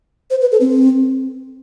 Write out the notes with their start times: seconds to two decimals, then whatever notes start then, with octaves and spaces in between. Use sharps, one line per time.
0.30 C5
0.41 B4
0.52 A4
0.61 C4